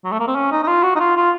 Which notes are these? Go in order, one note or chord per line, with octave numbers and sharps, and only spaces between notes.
F#3
A3
A#3
C4
C#4
D#4
D#4
F4
F#4
D#4
F4
F4